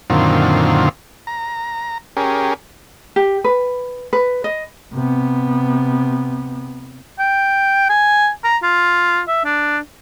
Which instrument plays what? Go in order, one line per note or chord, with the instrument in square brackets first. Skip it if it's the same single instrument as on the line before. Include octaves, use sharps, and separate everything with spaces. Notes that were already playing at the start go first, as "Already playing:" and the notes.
[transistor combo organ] F#2 A#2 D3 D#3 C4 F4
A#5
C#4 G4 G#4 A#4
[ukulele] G4
B4
B4
D#5
[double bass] C3 B3
[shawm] G5
G#5
A#5
F4
E5
D4